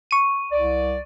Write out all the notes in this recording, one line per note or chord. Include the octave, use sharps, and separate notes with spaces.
C#6 D#7
C2 D5